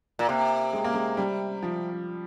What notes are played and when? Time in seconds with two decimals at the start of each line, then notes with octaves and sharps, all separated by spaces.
0.19 A#2
0.28 C3 A#3
0.73 G#3
0.84 A#3
0.94 G#3
1.17 G3
1.63 F3